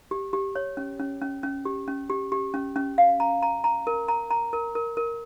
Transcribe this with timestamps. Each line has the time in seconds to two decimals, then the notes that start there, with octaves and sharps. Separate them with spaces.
0.11 G4
0.33 G4
0.56 C#5
0.77 C#4
0.99 C#4
1.22 C#4
1.43 C#4
1.65 G4
1.88 C#4
2.09 G4
2.32 G4
2.54 C#4
2.76 C#4
2.98 F5
3.20 A#5
3.43 A#5
3.64 A#5
3.87 A#4
4.08 A#5
4.31 A#5
4.53 A#4
4.75 A#4
4.97 A#4